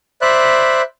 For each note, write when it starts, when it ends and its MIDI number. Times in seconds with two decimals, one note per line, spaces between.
0.22 0.82 72
0.22 0.82 74
0.22 0.82 76
0.22 0.82 83
0.22 0.82 90